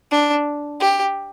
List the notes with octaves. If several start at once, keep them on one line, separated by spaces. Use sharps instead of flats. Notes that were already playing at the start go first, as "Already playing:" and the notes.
D4
G4